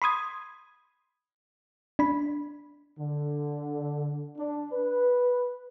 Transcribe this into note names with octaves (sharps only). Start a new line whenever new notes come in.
B5 C6 D#6 G#6
D4 B5
D3
D4
B4